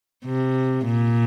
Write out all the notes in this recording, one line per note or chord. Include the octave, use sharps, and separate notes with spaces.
C3
A#2